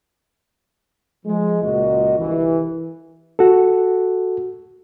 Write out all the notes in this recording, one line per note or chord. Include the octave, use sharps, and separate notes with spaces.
F3 G#3
C#2 A#2 F#4 D#5
G1 C2 E3
F#4 A4